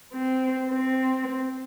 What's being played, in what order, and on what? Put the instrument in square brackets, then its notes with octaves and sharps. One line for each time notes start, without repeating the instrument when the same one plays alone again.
[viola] C4
C4